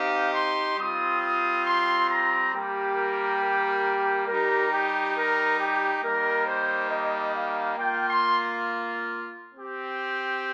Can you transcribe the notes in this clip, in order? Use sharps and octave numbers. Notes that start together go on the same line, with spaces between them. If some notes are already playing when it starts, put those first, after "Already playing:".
Already playing: C4 D#4 G4 F5
C6
G3 C4 F4 D#6
D#6
C6
A#5
G3 A#3 G4
A#4
A#4
G3 D#4 G4 A#4
G4
A#4
G4
G3 A#3 D#4 A#4
C5
D#5
F5
A#3 F4 G5
C6
C4 G4